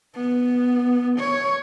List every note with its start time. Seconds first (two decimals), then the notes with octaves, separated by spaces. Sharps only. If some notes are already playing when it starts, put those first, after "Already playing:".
0.15 B3
1.19 C#5